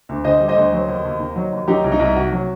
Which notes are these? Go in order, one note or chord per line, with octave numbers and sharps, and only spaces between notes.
D2
D3 C5 D#5
G3
C5 D#5
D2
F#3
D#2
D#2
D#3
F#3
D#2
F#3 D#4 G4
C2
D#4
C2
C3 F#4
F#3